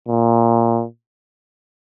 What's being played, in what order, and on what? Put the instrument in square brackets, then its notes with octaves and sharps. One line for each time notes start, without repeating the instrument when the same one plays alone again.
[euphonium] A#2